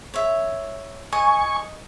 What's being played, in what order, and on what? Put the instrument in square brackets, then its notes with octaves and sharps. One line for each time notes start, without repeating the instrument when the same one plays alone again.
[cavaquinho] C#5 E5
[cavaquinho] D#5 [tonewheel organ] G#5 C#6